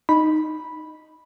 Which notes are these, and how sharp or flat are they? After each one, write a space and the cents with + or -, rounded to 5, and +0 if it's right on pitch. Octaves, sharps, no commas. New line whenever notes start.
D#4 +0 B5 -5